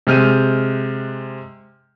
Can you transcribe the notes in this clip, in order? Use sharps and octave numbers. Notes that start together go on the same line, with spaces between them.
C3 G#3 F6 G6 D#7